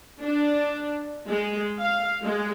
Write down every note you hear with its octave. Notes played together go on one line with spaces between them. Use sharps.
D4
G#3
F5
G#3